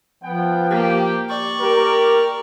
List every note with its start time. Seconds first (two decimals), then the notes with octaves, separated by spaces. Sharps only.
0.24 F3 B3 F#5 G5
0.70 A#3 G4
1.29 D5 C#6
1.61 G4 A#4